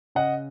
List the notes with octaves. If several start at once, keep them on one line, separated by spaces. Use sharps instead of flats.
C#3 D#5 F#5